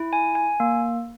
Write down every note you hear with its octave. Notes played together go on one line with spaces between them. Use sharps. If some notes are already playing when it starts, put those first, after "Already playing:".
Already playing: E4
G#5
G#5
A#3